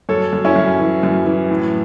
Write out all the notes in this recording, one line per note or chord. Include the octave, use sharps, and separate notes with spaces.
F#2 A4 C#5
F#2
C#4 E4
F#2
E3
F#2
E3
A2